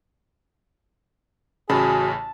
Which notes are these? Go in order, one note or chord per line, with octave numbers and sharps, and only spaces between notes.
A1 C#3 F#4 G#4 A5 B5